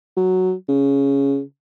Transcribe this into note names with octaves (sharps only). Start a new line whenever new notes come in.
F#3
C#3